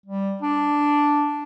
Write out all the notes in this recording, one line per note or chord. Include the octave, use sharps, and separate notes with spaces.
G3
D4